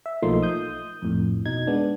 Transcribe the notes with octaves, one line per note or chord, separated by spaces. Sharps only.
E5
B1 F3 A3 A#3 D#4 C6
D#6 G6
F2 A2
B2 D#4 G#6
G#3 B3 D4